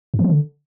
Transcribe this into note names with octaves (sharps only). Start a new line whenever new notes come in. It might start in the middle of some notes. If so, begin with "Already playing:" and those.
G2
E3
F3
D3